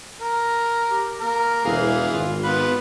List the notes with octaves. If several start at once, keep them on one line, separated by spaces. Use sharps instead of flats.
A#4
G4
A#3 A#4
E1 E3 G#4 F5
G#1 F4
B3 F4 B4